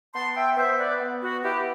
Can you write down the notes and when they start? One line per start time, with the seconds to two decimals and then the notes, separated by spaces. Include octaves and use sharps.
0.14 B3 A5 C6
0.35 E5 G5
0.57 B3 C5 E5
0.79 B4 D5
1.01 B3
1.23 F#4
1.44 B3 E4 G4